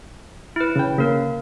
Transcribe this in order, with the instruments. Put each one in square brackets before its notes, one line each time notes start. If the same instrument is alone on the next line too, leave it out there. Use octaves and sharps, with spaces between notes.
[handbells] E4 B4
[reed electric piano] C#3 G5
[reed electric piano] C#3 [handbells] A#3 A#4